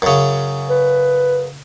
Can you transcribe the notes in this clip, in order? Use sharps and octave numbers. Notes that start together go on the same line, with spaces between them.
F#2 C#3
B4